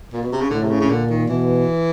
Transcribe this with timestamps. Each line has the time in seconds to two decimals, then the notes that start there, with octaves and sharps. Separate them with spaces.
0.13 A#2
0.22 B2
0.32 C3
0.41 C#3
0.50 A2 D3
0.63 C3
0.70 C#3
0.80 C#3
0.89 A#2 D3
1.09 D#3
1.28 B2 E3